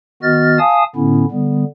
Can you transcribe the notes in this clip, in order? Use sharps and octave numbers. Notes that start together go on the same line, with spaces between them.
D#3 B3 F#4 D#5 F6 A6
F5 G#5 A5 D#6
A2 D3 B3 C#4 E4
D3 G3 B3